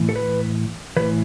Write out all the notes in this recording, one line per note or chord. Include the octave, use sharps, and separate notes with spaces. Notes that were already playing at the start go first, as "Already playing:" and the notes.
Already playing: A2 E3
A4
B4
A2 E3 B4